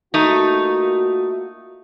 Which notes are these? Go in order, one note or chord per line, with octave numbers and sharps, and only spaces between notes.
A3 A#3 D#4 F4 F#4